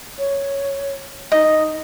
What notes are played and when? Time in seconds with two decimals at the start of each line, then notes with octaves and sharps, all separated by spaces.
0.18 C#5
1.32 D#4 D#5